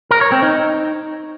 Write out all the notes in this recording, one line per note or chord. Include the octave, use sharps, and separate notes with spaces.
A#4
C#5
C4
D#4